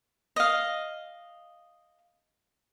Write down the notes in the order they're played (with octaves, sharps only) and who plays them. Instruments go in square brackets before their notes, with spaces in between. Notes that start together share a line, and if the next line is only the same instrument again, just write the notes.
[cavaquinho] D#5 F5